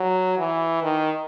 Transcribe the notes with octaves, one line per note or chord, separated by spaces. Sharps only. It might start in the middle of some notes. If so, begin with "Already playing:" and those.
Already playing: F#3
E3
D#3